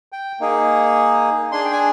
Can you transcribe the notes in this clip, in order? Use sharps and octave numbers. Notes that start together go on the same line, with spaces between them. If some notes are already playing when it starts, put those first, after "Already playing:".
G5
A#3 D#4 G#4
D4 G#4 C6
G5
G#5